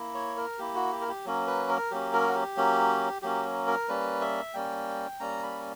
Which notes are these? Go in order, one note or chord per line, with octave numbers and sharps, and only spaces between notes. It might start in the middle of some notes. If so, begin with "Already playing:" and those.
Already playing: A#3 E4
C#5
A#4
A#3 E4 G4
F#4
G4
A#4
G4
F#3 A#3 C#4
B4
A#4
F#3 A#3 C#4 G4
A#4
F#4
G4
F#3 A#3 C#4
F#3 A#3 C#4 G4
A#4
G3 A#3 C#4 B4
E5
G3 A#3 C#4 G5
G3 A#3 C#4 A#5
B5